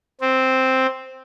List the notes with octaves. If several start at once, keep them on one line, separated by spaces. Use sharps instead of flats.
C4